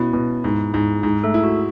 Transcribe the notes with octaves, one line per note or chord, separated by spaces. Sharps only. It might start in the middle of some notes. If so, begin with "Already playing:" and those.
Already playing: B2 C#4 E4
B2
G#2
G#2
G#2
A3 A4
E4
F#4